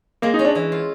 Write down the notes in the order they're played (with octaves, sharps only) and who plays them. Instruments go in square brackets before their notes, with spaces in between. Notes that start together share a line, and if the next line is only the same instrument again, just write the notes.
[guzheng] G#3 [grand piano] A#3
[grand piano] D#4
[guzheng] C#4
[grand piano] D4
[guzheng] E3
F4